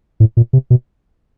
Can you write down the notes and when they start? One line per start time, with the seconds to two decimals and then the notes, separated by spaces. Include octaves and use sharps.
0.20 A2
0.37 A#2
0.53 C3
0.70 B2